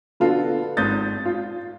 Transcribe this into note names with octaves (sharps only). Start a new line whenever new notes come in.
D3 B3 F4 F#4 A4
G#1 D#6 G6 A6
F4